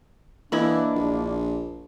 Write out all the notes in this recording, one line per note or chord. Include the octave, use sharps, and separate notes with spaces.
E3 A#3 D4 E4 D#5 B5
A#1